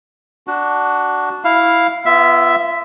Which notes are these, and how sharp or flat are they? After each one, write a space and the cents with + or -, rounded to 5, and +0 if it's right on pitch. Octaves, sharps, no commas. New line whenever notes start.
D4 +0 F#4 +10
E4 +0 F5 +0
B3 +0 F4 -35 E5 +5